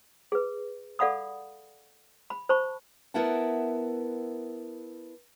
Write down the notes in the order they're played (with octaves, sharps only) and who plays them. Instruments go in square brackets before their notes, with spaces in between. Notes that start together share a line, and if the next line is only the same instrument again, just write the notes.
[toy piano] G#4 B4
A4 D5 F5 F#5 B5 D#6
B5
C5 A5 B5 C#6
[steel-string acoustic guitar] B3 E4 A#4 E5 F#5 A5